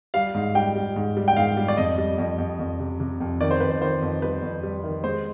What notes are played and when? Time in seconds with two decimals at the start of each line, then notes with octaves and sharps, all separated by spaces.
0.14 G3 F5
0.35 G#2
0.55 G3 G5
0.75 G3
0.96 G#2
1.17 G3
1.28 G5
1.37 G#2 F5
1.57 G3
1.68 D5
1.77 F2 D#5
1.98 G3
2.18 F2
2.38 F2
2.59 F2
2.80 C3
3.00 C3
3.20 F2
3.41 D#3 D5
3.51 C5
3.60 F2 B4
3.70 C5
3.82 D#3 C5
4.02 F2
4.22 G3 B4
4.42 F2
4.63 G3
4.84 D#3
5.04 G#3 C5